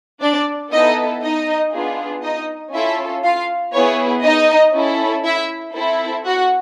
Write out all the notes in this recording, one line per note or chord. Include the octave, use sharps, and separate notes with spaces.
D4 D5
B3 D#4 E4 A4 D#5
D#4 D#5
B3 D4 F4 G#4
D#4 D#5
C#4 E4 F4 A4 E5
F4 F5
B3 E4 G#4 C#5
D#4 D#5
C#4 E4 A4
E4 E5
C4 E4 A4
F#4 F#5